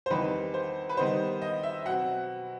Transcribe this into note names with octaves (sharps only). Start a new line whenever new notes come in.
C5
E2 D#3 G3 C4 D#4 B4
C5
B4
D#3 G3 B3 D#4 C5
D#5
E5
B2 F#3 C4 F#5